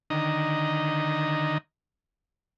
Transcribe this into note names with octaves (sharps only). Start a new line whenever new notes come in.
D3 D#3 D#5 A#5